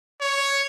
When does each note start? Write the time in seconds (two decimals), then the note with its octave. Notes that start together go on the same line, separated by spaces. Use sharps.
0.21 C#5